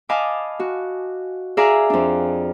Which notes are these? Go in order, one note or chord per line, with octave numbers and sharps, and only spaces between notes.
D#5 F5 G#5 A5 B5 D6
F#4
G#4 D5 E5 F5 G#5 A#5
F2 D4